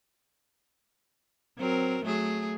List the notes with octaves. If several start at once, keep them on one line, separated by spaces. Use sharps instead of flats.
F#3 C4 A#4
F#3 A3 G#4